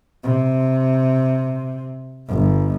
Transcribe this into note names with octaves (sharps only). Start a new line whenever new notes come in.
C3
G1